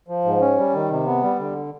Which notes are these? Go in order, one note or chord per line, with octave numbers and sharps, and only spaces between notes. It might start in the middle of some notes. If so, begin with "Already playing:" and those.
F3
G#2
C#4
G3
D#3
C3
B3
G3
D3